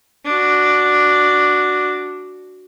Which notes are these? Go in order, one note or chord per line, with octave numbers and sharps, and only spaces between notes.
D4 F#4